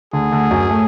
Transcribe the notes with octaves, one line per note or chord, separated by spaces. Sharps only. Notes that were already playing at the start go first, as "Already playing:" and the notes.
D2 D3 G#4
D2 D3
F#2 F#3
A2 A3